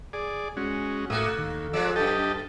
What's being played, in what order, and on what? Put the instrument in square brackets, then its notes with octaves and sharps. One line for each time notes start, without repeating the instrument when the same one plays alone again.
[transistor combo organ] G#4 D5
G#3 C#4 F#4
[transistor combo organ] A2 E5 D#6 [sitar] A#3 F#4 A4
[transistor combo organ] D#2
[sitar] F3 G#3 [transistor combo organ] D5 E6
[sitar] F#2 A4 [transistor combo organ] G4 D#5 A5